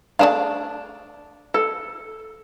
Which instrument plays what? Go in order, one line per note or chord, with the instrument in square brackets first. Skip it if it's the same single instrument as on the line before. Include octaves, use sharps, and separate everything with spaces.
[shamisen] A3 G#4 F5 [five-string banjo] D4 A5
[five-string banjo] A4